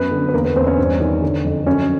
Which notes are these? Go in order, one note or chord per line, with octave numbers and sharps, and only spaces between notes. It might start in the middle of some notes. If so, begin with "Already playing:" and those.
Already playing: F#2 B3 B4
D3
B4
E2 A#3 A#4
B3 B4
E2 C4 C5
C#4 C#5
G2
D#3
D3
F2
F#2 C#4 C#5